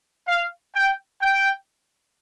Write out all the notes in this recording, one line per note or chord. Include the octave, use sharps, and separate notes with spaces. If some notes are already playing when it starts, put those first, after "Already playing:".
F5
G5
G5